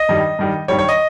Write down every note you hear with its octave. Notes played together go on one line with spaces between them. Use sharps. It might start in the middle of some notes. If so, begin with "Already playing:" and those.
Already playing: D#5
G2 D#3 G3
G2 D#3 G3
G2 D#3 G3 C#5
C#5
D#5